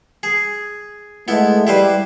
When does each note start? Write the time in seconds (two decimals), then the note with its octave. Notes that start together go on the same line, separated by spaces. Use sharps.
0.23 G#4
1.28 G#3 A3 B3 E4
1.67 G3 E4 B4 C5